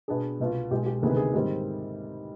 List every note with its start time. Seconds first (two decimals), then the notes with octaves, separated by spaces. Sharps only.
0.08 B2 B3 D4 G#4
0.40 C2 B2 B3 F4
0.71 B1 B2 G#3 G4
0.86 G4
1.02 D2 C3 D#3 B3 G#4
1.10 B4
1.17 G#4
1.34 G#2 D#3 G3 C4 G4